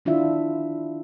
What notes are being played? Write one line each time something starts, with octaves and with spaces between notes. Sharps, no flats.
D#3 D4 E4 F4 E5